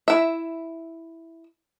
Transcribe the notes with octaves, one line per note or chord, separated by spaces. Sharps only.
E4 E5